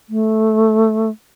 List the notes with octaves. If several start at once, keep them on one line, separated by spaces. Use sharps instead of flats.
A3